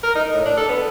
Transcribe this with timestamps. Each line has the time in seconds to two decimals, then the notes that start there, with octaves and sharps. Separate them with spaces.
0.03 A#4
0.15 D#4
0.34 A2
0.46 D4
0.57 A4
0.69 B3